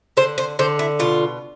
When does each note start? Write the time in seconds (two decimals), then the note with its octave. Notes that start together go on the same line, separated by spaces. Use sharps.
0.17 D3 C5
0.38 C5
0.59 D3 C5
0.79 E4
0.99 B2 F4